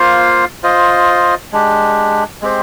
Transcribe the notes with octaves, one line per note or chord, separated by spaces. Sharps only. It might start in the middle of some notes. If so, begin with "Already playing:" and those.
Already playing: A#3 F4 C5 F5
F4 C5 D#5
G#3 D4 G4
G#3 C4 G4 C5